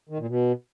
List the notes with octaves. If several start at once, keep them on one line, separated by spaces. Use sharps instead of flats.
D#3
A#2
B2